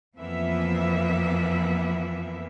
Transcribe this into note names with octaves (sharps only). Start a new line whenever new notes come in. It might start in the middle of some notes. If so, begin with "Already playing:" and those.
F2 E3 F3 A#3 B3 E5